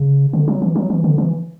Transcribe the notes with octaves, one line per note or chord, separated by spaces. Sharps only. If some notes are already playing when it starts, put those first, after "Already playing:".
Already playing: C#3
D3
F#3
E3
F#3
E3
D3
E3